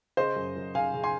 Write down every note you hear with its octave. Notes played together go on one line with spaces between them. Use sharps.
C#3 C5 D#5
F#2
F#2
C#3 F5 G#5
C#3
G#5 C6